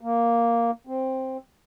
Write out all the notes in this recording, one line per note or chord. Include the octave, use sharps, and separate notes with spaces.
A#3
C4